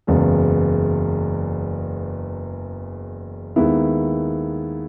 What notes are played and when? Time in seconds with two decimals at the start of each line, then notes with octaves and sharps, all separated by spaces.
0.07 F#1 E2 C#3 G#3
3.56 D#2 D#3 G#3 B3 E4